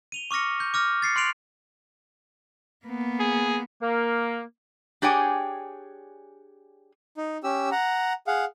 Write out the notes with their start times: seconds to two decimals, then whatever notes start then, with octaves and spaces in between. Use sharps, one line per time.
0.12 D#7 F7 G7
0.31 C#6 D6 F6 A#6 C#7
0.60 G6
0.74 D6 F6 A#6
1.02 A6 C7 C#7
1.16 C6 F#6 C7 D7 F7 F#7
2.86 A#3 B3
3.20 G#4
3.81 A#3
5.02 D4 G4 G#4 C#5 G5 G#5
7.17 D#4
7.44 C#4 G4 E6
7.72 F#5 A#5
8.27 G#4 F5 F#5